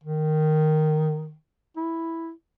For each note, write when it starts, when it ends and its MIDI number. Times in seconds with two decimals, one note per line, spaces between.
0.03 1.34 51
1.76 2.31 64